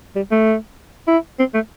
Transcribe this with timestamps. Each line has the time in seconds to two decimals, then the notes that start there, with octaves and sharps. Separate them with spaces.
0.16 G3
0.31 A3
1.08 E4
1.39 C4
1.55 A3